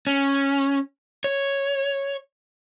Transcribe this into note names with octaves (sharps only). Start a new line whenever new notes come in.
C#4
C#5